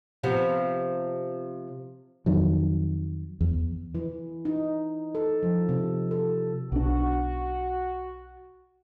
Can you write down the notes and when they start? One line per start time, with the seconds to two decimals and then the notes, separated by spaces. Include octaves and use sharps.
0.23 C3 F3 B3
2.26 F2 D#3 F#3
3.41 E2
3.95 E3
4.45 D#4
5.15 A4
5.43 F3
5.69 C3
6.11 A4
6.72 B1 D4 F#4